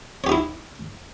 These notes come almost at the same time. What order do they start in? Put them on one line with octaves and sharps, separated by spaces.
C#5 G4 D#4 E4